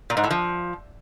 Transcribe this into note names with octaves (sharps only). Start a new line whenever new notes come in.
A#2
G#2
A2
F3